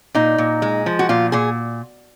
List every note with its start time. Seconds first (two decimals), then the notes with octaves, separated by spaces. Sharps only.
0.15 A#2 D#4
0.38 A#2
0.62 G#3
0.86 F3
0.99 F#4
1.09 A#2 F4
1.32 A#2 G#4